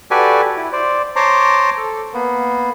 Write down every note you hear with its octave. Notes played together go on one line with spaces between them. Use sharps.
F#4 G4 A4 B4 D5 G#5
E4
C5 D5
C5 C#5 A5 A#5 C6 D6
A4
A#3 B3